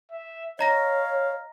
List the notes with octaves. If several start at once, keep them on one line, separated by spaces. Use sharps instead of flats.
E5
C#5 D#5 F5 A#5 A#6